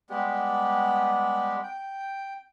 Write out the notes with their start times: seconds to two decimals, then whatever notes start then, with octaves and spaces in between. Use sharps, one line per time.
0.10 G3 G#3 B3 G4
1.63 G5